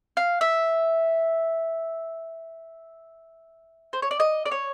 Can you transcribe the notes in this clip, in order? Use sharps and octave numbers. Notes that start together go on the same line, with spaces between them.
F5
E5
C5
C#5
D5
D#5
D5
C#5